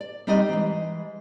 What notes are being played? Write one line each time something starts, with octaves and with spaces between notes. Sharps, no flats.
D5
G3 C4 D#4 G4 D5 D#5
E3 G#3